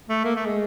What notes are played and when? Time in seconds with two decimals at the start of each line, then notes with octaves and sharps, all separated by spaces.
0.09 A3
0.24 A#3
0.35 A3
0.46 G#3